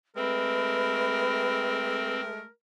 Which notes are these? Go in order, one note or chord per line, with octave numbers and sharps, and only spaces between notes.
G#3 A3 C4 A#4 B4